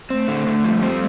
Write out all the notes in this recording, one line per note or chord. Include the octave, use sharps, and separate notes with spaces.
A3 C4
D3
D3
F3 G3
C4